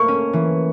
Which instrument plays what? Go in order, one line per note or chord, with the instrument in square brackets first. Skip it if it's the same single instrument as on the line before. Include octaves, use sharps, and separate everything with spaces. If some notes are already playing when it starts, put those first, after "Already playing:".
Already playing: [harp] A3 A#3 [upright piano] C#6
[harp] C#4
E3